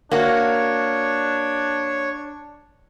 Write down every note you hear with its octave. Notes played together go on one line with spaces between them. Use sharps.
A#3 D4 F#4 C#5